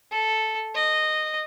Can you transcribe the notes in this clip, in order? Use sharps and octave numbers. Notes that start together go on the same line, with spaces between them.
A4
D#5